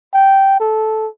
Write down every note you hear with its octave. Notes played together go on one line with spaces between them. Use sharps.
G5
A4